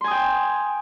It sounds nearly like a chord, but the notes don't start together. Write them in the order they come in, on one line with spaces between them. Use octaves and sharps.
C6 G#5 D#6 G5